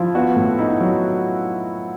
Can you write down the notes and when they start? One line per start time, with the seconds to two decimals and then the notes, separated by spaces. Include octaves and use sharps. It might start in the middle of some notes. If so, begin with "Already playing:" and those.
Already playing: F3 E4 F4
0.15 B3 F#4
0.36 A2
0.59 D#4 E4
0.80 F#3